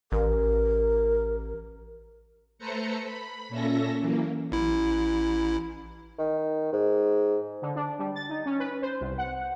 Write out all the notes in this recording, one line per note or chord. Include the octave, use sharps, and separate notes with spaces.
A1 A#4
A3 A4 B4 C5 A#5 C#7
B5
A#2 C#4 A4 E5 A#6
F#2 E3 A#3
A1 E4
D#3
G#2
D3
D4
G3
A6
D#4
C#4
B4
C5
C2
F#5